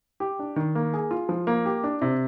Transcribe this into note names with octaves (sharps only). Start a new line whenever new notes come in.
G4
D4
D#3
A#3
G#4
F4
F3
A#3
G4
D4
C3